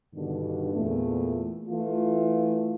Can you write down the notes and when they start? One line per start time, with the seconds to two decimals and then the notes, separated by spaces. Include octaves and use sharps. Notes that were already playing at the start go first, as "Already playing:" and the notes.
0.14 G2 B2 D3 D#3
0.74 E2 A#2 A3
1.69 E3 A3 F4